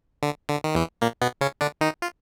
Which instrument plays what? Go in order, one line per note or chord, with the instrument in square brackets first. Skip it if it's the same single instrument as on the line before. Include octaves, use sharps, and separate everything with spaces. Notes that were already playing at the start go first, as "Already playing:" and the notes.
[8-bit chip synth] D3
D3
D#3
E2 E3
A#2 A#3
B2 B3
C#3 C#4
D3 D4
D#3 D#4
F4